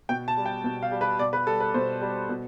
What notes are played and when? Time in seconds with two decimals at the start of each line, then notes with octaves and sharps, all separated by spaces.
0.09 B2 G5
0.28 A5
0.37 G3
0.46 G5
0.64 B2
0.83 F5
0.91 G3
1.01 B4
1.19 B2 D5
1.33 B4
1.47 G3 A4
1.61 B4
1.74 B2 C5
2.01 G3
2.29 B2